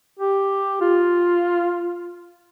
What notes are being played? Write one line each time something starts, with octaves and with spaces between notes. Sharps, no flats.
G4
F4